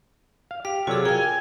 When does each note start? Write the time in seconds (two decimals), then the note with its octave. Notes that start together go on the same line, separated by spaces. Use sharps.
0.51 F5
0.65 G4 F5
0.87 C3 F#3 F4 G#4 A4 D5
1.05 A#4 F5 G5 G#5